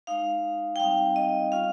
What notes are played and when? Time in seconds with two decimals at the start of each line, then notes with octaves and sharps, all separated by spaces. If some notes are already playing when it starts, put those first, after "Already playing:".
0.07 G#3 D#4 F5
0.76 G5
0.79 G3 C4 D#4 F5
1.16 D#5
1.51 G3 C#4 F4 F5